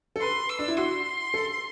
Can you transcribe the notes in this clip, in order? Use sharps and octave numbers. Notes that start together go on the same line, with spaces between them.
A4
B4 C6
E6
D4
E4
F#4 C6
A4